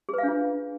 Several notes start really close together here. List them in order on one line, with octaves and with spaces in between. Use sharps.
G#4 B4 F5 D4 F4